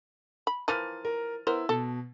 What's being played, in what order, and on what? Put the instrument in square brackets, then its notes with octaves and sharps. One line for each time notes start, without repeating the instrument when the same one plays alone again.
[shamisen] B5
[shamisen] E3 F3 A#3 [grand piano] F6 A6 D#7
[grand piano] A#4
[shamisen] B3 A#4 C5 [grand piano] E4
[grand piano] B2 [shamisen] A4